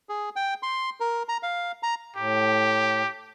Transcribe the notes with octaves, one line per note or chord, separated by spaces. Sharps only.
G#4
G5
C6
A#4
A#5
F5
A#5
A2 G4